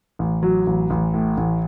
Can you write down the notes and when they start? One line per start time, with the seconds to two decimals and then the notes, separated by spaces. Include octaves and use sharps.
0.19 A1
0.43 F#3
0.67 A1
0.90 A1
1.14 A2
1.37 A1